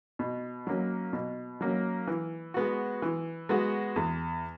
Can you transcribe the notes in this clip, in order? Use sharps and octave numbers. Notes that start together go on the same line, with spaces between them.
B2
F#3 A#3 C#4
B2
F#3 A#3 C#4
E3
G#3 B3 F#4
E3
G#3 B3 F#4
E2